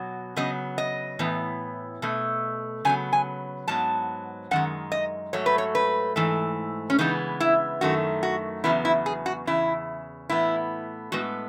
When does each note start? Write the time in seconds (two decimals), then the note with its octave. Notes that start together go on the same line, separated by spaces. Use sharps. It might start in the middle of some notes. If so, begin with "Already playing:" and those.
Already playing: B2 F#3 B3
0.36 C#3 F#3 B3 D#5
0.78 D#5
1.19 A2 E3 B3
2.02 B2 A3
2.85 C#3 F#3 B3 G#5
3.13 G#5
3.68 G#2 F#3 B3 A5
4.51 F#2 D#3 G#3 F#5
4.92 D#5
5.33 G#2 F#3 A3 C#5
5.46 B4
5.58 C#5
5.75 B4
6.16 G#2 E3 A3
6.90 C#4
6.99 C#3 E3 G#3 B3 D#4
7.40 E4
7.81 F#2 D#3 A3 F#4
8.23 F#4
8.64 E2 C#3 F#3 B3 E4
8.85 E4
9.06 G#4
9.26 F#4
9.47 E2 C#3 E4
10.29 A2 E3 B3 E4
11.12 A2 G#3 B3 F#4